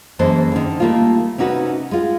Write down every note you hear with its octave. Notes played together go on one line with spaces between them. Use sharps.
F#2 E3 G#3 A#3 A4 C5
D3 D#3
G3 A3 A#3 D#4 F4
C3 C#4 D#4 F#4 B4
G#3 F4